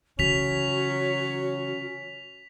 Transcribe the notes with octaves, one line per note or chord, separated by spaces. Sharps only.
C#3 E3 F#3 C#4 F#4 B6 F7